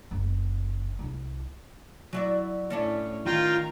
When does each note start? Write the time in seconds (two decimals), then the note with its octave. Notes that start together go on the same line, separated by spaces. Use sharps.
0.11 F#1
0.99 C2 E4
2.13 F#3 E4 D5
2.70 A2 C#4 D4 E4 C#5
3.26 D#3 F4 A#4 G5 A#5